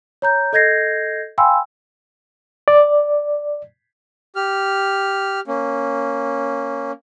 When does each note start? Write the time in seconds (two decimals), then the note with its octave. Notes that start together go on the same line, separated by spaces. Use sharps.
0.22 C#5 A#5 G6
0.53 A4 D#5 G6 G#6 A#6 C7
1.38 F5 G5 G#5 B5 C6 E6
2.68 D5
4.36 G4 F6
5.47 A#3 C#4